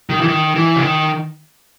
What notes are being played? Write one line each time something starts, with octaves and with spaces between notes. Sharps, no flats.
D#3
E3
D#3
E3
C#3
D#3